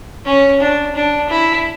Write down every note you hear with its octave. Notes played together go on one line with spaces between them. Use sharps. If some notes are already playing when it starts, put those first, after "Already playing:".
C#4
D4
D4
E4